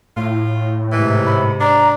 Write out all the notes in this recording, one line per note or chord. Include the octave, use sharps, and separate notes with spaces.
A2 F4
G#2 C3 E3
B5
D4 A#5